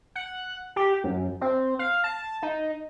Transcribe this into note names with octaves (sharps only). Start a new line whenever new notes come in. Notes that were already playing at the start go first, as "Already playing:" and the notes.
F#5
G4
F#2
C4
F5
A5
D#4